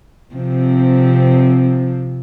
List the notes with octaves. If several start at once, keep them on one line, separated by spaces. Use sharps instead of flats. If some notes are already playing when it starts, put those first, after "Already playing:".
C3 F3 C4